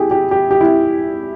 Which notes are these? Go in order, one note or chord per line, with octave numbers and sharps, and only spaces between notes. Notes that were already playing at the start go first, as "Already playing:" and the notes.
Already playing: E4 G4 G#4
G4
G4
G4
E4